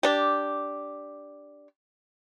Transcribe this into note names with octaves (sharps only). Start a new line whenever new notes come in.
D4 G4